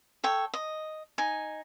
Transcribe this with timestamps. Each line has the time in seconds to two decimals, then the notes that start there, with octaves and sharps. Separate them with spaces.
0.24 A4 C#5 G5
0.54 D#5
1.18 D#4 G#5